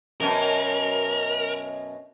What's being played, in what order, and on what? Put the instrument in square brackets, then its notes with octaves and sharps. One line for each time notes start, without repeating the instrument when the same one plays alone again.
[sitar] F#2 B2 C#4 [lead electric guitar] A#4